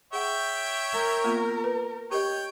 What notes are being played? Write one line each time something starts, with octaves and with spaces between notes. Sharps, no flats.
G#4 C#5 E5 F#5 G5
A#4
A#3 B3 F4
B4
G4 A#4 C#5 D#5 G5